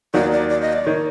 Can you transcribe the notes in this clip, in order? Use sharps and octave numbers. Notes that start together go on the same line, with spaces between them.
D#2 D#3 F#3 D5
D5
D5
D#5
D5
D#3 C#5